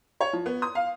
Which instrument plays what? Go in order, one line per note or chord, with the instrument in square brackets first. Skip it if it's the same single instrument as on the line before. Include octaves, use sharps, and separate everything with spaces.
[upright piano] C#5
F3
B3
D#6
F5